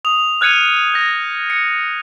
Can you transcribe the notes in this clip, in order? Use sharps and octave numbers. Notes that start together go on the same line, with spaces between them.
D#6 F7
F6 F#6 G#6 C#7 D#7 F7
G6 A#6
C#7